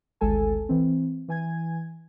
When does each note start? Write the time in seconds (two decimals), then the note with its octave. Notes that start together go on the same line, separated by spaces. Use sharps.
0.21 G#1 D2 G#3 A4 G#5 A5
0.69 E3 C4
1.28 E3 G#5 G#6